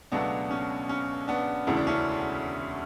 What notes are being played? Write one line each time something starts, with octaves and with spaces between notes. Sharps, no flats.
C#2 B2 F#3 A3 B3 D4
C#4
C#4
B3 D4
E1 D2 C#3 E3 A3 E4
D4
C#4 E4